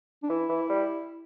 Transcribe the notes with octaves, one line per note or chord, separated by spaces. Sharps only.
D4
E3 E4
E3
E3
G3